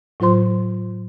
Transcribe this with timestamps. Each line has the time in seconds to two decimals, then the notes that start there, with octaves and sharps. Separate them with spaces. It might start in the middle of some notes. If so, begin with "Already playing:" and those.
0.20 A2 F#3 F4 C5 C6